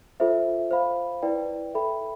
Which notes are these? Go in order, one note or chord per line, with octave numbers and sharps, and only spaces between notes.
F4 A4 C5 E5
C5 F5 B5
E4 B4 D5 G5
A4 E5 G5 B5